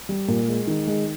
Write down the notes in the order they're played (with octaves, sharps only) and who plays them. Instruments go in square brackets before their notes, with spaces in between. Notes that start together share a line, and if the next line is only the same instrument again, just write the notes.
[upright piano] G3
A#2
G#3
D#3
G#3